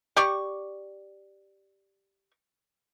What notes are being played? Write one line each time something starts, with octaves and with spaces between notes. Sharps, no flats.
G4 D5 C#6